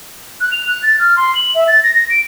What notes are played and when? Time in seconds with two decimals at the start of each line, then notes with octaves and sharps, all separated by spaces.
0.41 F#6
0.52 F7
0.68 F#6
0.83 A6
0.99 F6
1.16 C6
1.35 F#7
1.55 E5
1.68 A6
1.83 A#6
1.95 A#6
2.10 D7